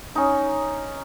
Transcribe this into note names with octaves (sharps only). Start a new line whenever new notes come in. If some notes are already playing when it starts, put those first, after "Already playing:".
C#4 D#4